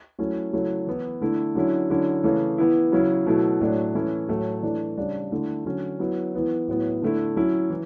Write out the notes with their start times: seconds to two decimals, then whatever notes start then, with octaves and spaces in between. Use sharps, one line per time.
0.18 F#3 A3 C#4 E4
0.53 C#3 F#3 A3 E4
0.87 E3 B3 E4
1.21 D3 A3 E4
1.55 D3 F#3 C#4 E4
1.90 D3 F#3 C#4 E4
2.24 C#3 E3 A3
2.58 E3 B3 E4
2.92 C#3 F#3 C#4 E4
3.26 B2 F#3 A3 E4
3.60 A2 F#3 A3 D4
3.95 E3 A3 C#4 E4
4.29 A2 F#3 A3
4.62 E3 A3 D4
4.97 C#3 G3 D4
5.31 D3 A3 E4
5.65 D3 F#3 C#4
6.00 F#3 B3 E4
6.34 E3 B3 E4
6.68 A2 F#3 B3 E4
7.02 D3 A3 E4
7.36 F#3 C#4 E4
7.70 E3